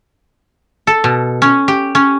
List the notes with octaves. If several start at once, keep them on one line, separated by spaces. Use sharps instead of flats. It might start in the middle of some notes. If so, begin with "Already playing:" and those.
A4
B2
C#4
G4
C#4